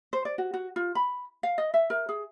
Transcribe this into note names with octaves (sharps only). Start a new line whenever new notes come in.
C5
D5
F#4
F#4
F4
B5
F5
D#5
E5
A#4
G#4